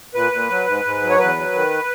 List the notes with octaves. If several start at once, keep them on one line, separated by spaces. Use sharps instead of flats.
A#2 B4
A#2
F#3
G#2
G#2
F#3
C#5
E2 B4
F#3
D#3